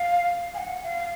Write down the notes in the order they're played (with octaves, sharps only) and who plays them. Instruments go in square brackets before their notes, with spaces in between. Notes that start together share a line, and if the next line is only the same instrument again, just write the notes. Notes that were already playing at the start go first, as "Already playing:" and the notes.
Already playing: [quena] F5
G#5
F#5
F5